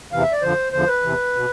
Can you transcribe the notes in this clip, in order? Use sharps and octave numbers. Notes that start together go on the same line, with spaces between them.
E2 C3 E3 F5
E5
D5
F2 D3 F3 C5
E2 D3 F3 C5
B4
E2 C3 E3
B2